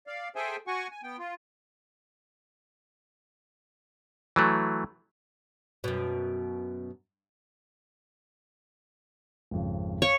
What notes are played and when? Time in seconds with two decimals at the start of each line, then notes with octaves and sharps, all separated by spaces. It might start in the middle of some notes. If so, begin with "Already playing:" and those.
0.07 D5 F5
0.36 G#4 A4 C5 E5 G5 G#5
0.67 F#4 F#5 G#5 C#6
0.91 G#5
1.03 B3 G5
1.19 F4
4.36 E3 F#3 A3
5.84 F#2 B2
9.51 G#1 F2 C#3
10.02 C#5 F5